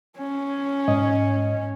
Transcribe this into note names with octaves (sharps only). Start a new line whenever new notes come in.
C#4
G#2 D#5